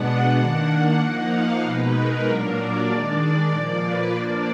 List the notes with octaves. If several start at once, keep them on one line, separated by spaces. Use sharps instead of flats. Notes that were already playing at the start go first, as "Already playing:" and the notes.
Already playing: B2 G#3 B3 D4 F#5
D#3 A#3 D4
F3 A#3 D#4 F#5
F5
B2 G#3 D#4 B4
A#4
A#2 F#3 A#3 D4 A#4
D5
D#3 G#3 D4
A#2 F3 A#3
B4
F3 A#3 D4 D5